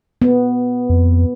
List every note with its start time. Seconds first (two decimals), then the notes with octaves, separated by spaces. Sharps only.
0.22 B3
0.90 F2